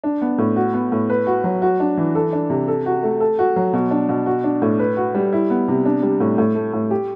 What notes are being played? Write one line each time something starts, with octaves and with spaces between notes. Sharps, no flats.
D4
B3
A2
F#4
B3
A2
B4
F#4
F#3
F#4
D4
E3
A4
D4
C3
A4
F#4
A3
A4
F#4
F#3
B2
D4
B2
F#4
D4
A2
B4
F#4
G3
E4
B3
C3
D4
G3
A2
A2
A3
A2
G4